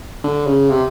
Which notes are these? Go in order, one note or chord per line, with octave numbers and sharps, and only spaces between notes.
D3
C#3
C3